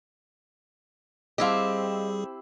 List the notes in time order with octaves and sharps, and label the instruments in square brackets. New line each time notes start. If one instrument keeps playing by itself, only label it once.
[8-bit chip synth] G3 G#4 [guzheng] C4 E4 G4 [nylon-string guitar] D#5 F5